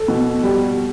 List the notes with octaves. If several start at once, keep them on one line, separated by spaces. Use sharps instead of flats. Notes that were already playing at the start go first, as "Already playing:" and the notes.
Already playing: A4
B2
G3